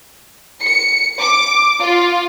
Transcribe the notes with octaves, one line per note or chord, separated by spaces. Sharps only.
C#7
D6
F4